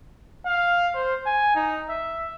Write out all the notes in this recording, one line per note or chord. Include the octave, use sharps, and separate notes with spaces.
F5
C5
G#5
D#4
E5